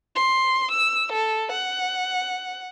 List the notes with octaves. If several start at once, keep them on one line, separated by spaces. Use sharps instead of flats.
C6
E6
A4
F#5